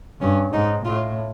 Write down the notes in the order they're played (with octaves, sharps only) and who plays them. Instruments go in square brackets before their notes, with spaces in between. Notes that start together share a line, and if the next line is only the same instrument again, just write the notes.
[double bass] G2 [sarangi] C#4
[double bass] G#2 [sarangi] D#4
[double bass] A2 [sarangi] F4